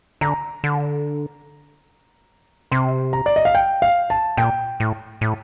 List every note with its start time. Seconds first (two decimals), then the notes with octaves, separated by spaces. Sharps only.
0.21 D3 A#5
0.64 D3
2.72 C3 C6
3.13 A#5
3.26 D5
3.36 D#5
3.45 F5
3.55 G5
3.82 F5
4.10 A5
4.37 A#2 G5
4.80 A2
5.21 A2